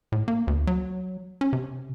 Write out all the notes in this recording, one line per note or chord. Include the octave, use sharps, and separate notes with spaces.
A2
A#3
D2
F#3
C#4
C3